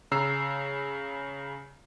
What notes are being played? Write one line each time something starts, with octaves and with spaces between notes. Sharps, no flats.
C#3 A#5 E6 C7